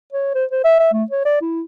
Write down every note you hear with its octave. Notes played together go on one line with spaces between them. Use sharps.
C#5
C5
C5
E5
E5
A3
C#5
D5
E4